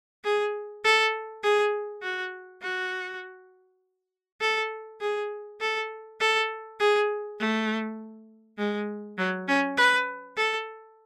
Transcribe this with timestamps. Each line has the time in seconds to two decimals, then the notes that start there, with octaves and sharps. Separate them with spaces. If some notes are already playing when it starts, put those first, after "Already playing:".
0.24 G#4
0.85 A4
1.43 G#4
2.03 F#4
2.62 F#4
4.41 A4
5.01 G#4
5.61 A4
6.20 A4
6.80 G#4
7.40 A3
8.58 G#3
9.18 F#3
9.48 C#4
9.78 B4
10.37 A4